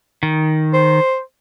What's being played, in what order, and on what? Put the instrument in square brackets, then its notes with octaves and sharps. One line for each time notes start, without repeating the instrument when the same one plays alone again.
[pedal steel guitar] D#3
[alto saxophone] C5